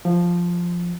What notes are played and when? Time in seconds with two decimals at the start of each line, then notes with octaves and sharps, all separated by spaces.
0.05 F3